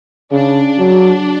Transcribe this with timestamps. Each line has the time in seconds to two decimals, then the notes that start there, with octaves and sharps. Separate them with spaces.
0.32 C#3 D4
0.78 F#3